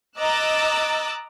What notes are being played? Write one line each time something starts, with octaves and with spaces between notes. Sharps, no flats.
D#5 A#5 D6 E6 F#6 A6